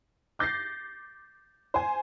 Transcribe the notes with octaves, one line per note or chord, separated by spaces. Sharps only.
D6 G6 A6 A#6 C7
C5 G#5